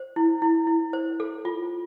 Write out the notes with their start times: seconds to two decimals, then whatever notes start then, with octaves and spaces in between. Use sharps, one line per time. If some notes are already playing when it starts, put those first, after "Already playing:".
Already playing: C5
0.16 E4
0.42 E4
0.67 E4
0.93 C5
1.20 A4
1.45 F4